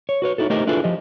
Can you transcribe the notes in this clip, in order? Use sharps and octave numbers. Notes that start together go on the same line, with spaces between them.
C#5
F#4 B4 C#5
D#4 E4 F#4 A4
A3 D#4 G4 A#4 C5 D#5
D4 E4 F4 G#4 A4 B4
F3 G4 D#5